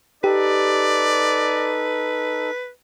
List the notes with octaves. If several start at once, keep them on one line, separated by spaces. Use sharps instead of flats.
D#4 G4 A4 B4 D5